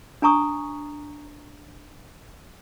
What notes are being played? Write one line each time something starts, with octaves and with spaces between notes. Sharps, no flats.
D4 G#5 A#5 C#6 D#6